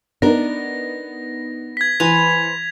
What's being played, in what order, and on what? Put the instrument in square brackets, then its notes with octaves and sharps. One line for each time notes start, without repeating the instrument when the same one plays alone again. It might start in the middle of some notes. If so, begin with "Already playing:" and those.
[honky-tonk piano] B3 D#4 [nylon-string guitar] D4 A#4 [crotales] A#6
[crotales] G#6 B6
[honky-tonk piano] E3 [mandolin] B4 C5 G#5 [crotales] F7